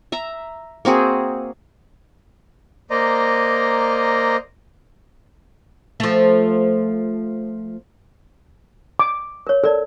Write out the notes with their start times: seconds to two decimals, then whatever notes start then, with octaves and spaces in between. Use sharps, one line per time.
0.12 E5 A#5
0.85 A#3 C4 F#4 G#4
2.91 A#3 C5 D5 D#5 A#5
6.00 F3 A3
8.99 D6
9.47 A#4 C#5
9.64 A4 A#4 D5